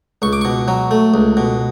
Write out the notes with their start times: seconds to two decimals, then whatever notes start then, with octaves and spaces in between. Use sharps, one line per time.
0.22 C#2 C#6
0.33 D6
0.41 B2 C#6
0.68 F#3
0.91 A3
1.14 C#2
1.37 B2